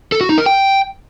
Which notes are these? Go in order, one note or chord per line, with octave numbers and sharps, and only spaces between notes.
A4
F#4
D#4
A#4
G5